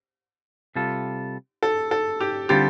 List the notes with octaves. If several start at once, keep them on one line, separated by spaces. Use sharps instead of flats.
C3 G3 F4 A4
A4
A4
G4
D3 G3 C4 F4 G4 A4